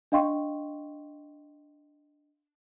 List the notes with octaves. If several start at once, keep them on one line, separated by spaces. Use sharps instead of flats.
D4 D#5 F5 G5 C6 C#6